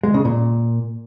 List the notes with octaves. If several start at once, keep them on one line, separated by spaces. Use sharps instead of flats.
G#3
C#3
A#2